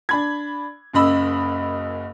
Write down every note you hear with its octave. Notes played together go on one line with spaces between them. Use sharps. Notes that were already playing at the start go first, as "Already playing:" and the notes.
D4 B5 G#6
F#1 F#2 D#5 B5 E6